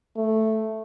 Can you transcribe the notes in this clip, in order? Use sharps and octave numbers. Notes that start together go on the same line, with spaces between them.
A3